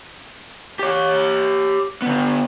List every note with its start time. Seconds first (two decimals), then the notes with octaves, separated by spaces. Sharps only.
0.79 G4 C#5
2.02 D3 B3